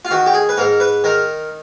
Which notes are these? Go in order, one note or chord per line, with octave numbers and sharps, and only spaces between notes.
F4
D#3 F#4
G4
G#4
B4
G#2 A#4
B4
D#3 A#4